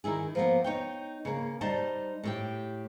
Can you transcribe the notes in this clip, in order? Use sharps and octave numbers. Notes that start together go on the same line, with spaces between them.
D#3 D#4 E4 G#4
F3 A#3 B3
D#4 C#5 G5
C#3 A#3
G3 D#4 C5 A5
A2 G4 G5